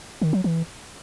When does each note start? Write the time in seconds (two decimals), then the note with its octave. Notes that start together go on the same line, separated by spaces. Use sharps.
0.22 D#3
0.33 F#3
0.44 E3